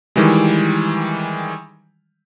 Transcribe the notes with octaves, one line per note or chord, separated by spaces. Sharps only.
D#3 E3 G3 G#3